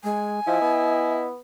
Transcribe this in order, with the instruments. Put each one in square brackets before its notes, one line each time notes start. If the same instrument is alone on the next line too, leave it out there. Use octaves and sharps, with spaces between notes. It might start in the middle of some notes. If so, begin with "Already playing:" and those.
[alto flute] G#3 [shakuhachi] G#5
[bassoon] F3 [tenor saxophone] E4 [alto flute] D#5
[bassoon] B3